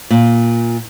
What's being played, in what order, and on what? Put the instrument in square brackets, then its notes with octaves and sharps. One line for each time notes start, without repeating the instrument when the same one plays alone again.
[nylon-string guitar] A#2